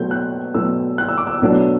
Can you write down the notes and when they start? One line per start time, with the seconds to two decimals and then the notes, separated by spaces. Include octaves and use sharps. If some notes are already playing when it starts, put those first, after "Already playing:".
Already playing: B2 F#3 A3 G6
0.11 F#6
0.54 B2 F#3 A3 E6
0.98 F#6
1.08 E6
1.18 D6
1.27 E6
1.42 B2 F#3 A3 D4